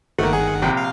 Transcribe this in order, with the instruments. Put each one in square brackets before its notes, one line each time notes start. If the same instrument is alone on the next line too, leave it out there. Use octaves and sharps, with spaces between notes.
[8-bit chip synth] G1 D#3 F#5 [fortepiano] A3 A#3
[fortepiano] G#4
A#1 C3 G5
[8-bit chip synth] F5